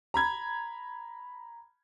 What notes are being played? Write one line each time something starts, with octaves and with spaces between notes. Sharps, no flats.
A#5 B5 G#6